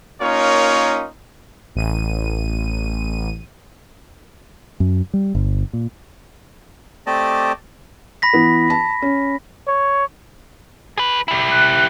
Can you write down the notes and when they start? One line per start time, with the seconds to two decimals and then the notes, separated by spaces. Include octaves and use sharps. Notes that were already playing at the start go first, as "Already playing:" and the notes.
0.21 A#3 C#4 D#4 F4 A#4 C#5
1.75 A1 D#7
4.80 F#2
5.14 G3
5.35 G1
5.73 A#2
7.07 A3 C4 G4 D5 D#5 A5
8.22 B5 A#6 B6
8.33 E3 B3
8.70 A5
9.02 C#4
9.68 C#5
10.98 G#4 B4
11.28 E4 G4
11.51 F#6